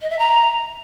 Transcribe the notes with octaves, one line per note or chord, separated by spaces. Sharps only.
D#5
E5
A#5